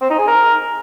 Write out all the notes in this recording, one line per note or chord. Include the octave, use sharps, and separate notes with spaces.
C4
D#4
G#4
A#4